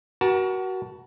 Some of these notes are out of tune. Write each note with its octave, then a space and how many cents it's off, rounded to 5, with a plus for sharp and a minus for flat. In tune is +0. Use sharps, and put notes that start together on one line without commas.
F#4 +20 A#4 +35 A5 +0